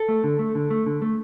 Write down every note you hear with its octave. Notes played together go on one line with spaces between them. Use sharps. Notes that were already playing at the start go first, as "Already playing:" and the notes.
Already playing: A4
A3
D3
A3
D3
A3
D3
A3